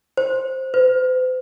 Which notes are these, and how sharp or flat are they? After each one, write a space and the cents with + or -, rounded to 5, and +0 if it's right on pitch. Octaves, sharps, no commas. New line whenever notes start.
C5 +5
C5 -45